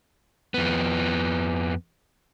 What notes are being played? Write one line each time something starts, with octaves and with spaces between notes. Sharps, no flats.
F2 B3